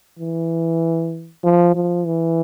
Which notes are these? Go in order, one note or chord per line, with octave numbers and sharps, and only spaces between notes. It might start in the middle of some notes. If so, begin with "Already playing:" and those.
E3
F3
F3
E3